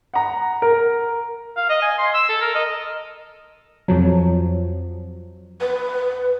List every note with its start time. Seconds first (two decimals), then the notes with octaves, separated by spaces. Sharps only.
0.14 F#5 A#5
0.62 A#4
1.57 F5
1.70 D#5
1.82 G#5
1.98 C6
2.14 E6
2.29 A4
2.41 A#4
2.55 D#5
3.88 F2 F3 F#3
5.61 B4